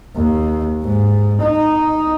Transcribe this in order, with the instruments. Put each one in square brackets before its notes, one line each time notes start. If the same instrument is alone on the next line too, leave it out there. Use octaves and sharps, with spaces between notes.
[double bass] D#2
G#2
D#4